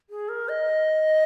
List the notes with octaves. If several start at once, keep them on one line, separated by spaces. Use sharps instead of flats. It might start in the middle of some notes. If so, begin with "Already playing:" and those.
G#4
A#4
D#5